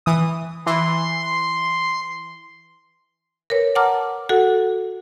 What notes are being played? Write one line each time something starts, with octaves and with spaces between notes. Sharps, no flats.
E3 D#6
E3 C6
A#4 B4 C#5
F#5 A5 A#5 D6 F6
F#4 A4 F#5